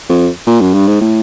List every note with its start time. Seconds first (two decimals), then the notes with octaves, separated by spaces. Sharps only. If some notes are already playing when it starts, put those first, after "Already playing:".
0.09 F2
0.46 A#2
0.61 F#2
0.74 G2
0.87 G#2
1.01 A2